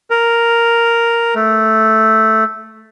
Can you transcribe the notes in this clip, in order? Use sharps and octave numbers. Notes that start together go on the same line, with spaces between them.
A#4
A3